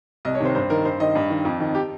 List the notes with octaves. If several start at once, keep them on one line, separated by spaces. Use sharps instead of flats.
C2 D#5
C#5
C3 D#3 C5
G2 C5
D#3 A#4
G2 C5
D#3 D#5
G2
D#3
F2
D#3
G4